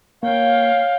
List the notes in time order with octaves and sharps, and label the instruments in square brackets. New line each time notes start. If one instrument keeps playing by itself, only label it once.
[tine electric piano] A#3 [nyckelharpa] C#5 G5 [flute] F5